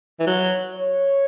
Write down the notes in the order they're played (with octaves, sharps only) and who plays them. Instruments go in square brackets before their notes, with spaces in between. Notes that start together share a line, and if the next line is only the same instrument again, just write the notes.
[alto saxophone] E3
F#3
[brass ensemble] C#5